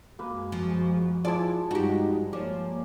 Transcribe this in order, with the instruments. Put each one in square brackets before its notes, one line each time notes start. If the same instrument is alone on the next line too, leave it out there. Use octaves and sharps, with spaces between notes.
[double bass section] F#2 G#3 [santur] A#3 B4 [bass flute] F#4
[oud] F3
[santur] F3 G#3 A5 [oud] E4 D5
[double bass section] G2 G3 G#3 [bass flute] D#4 [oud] F#4 G4 [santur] A#5
[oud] F3 [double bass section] A#3 [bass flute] C#5 [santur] D5